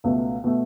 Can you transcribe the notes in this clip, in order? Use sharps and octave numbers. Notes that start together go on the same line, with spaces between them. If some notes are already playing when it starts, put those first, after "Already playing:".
C#2 B2 A3
B2 A3